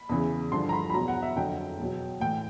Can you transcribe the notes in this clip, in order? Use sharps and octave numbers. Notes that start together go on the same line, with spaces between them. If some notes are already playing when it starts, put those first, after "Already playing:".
Already playing: B5
E2 C#3 E3
G2 D3 F3 C6
A#5
B5
B5
E2 B2 F#3 A#5
F#5
E5
F2 D3 F#3 G5
E2 B2 F#3
A2 E3 G5